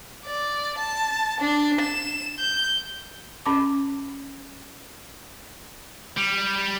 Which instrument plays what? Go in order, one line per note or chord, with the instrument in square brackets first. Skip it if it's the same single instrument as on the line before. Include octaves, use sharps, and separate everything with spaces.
[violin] D5
A5
D4
E7
G6
[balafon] C#4 B5 D6
[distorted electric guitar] G3